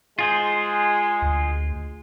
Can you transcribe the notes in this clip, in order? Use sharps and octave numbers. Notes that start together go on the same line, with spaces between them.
G#3 F4 G#4 C5
D2